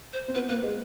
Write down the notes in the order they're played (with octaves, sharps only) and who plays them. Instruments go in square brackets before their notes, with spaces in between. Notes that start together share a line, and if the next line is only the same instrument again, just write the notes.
[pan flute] C5
[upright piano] C4
[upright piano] B3 [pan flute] B4
[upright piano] A#3 [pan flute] B4
[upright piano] G#3